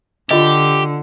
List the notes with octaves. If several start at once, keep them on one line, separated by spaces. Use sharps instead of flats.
D3 F4 G4 D#5